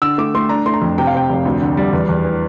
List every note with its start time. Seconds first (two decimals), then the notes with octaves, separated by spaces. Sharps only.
0.02 D3 E6
0.18 A3 D6
0.35 A3 C6
0.49 D4 A#5
0.66 A3 C6
0.74 A#5
0.82 F2
0.98 C3 G5
1.07 F5
1.14 C3 G5
1.30 F1
1.45 D2
1.62 D3
1.77 G3
1.93 E2
2.09 E2
2.24 E3